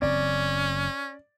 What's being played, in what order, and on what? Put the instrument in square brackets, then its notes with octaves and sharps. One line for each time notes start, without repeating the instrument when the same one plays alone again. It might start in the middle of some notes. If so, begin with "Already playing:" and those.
[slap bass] F#1 C4 [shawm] C#4 [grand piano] D5